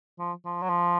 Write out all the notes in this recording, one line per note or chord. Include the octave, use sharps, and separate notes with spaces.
F3
F3
F#3
F3